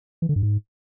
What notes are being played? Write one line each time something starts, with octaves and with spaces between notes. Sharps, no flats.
E3
D3
G2
G#2